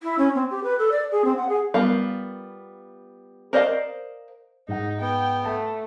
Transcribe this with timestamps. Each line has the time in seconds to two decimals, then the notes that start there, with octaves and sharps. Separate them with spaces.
0.02 E4
0.18 C#4
0.35 C4
0.50 G4
0.63 B4
0.78 A4
0.91 D5
1.11 G#4
1.24 C4
1.36 F#5
1.49 G#4
1.74 G3 B3 F4 A#4 F5
3.53 A#4 C5 D5 D#5 F5
4.68 G#2 D#4 F#5
5.01 B3 G5
5.45 A3 A5